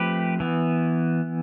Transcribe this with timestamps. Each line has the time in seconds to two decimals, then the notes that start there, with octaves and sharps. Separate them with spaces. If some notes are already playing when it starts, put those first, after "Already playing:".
Already playing: F3 A3 C4 G4 B4
0.40 E3 B3